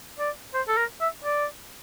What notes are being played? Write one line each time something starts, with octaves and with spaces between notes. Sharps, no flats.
D5
C5
A4
A#4
E5
D5